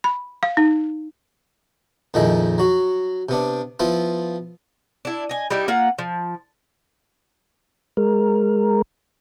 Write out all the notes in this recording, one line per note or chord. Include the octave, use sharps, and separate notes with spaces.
B5
F5
D#4
F2 A#2 D#3 F3 G#3 E4
F#3 F#4
C3 B3 D4
F3 B3 E4 F4
D4 E4
D#5 G#5
G3 D#4 E4 G4
A#3 F4 F#5
F3
G#3 A#4